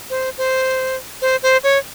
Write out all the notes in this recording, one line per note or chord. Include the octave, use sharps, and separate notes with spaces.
C5
C5
C5
C5
C#5